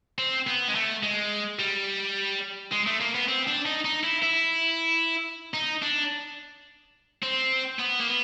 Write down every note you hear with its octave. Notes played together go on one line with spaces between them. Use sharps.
C4
B3
G#3
A3
G#3
G3
G#3
A3
A#3
B3
C4
D4
D#4
D#4
E4
E4
D#4
D4
C4
B3
A#3
B3